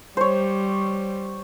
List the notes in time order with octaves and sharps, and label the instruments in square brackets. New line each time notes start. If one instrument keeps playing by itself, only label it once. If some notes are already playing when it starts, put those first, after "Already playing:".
[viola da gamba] G3 [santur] C5 C#5